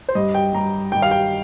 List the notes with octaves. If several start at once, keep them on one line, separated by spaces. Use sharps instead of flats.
C5
G2 G3 D#5
G5
G2 G3 A#5
G2 D#3 G3 G5
F5
G5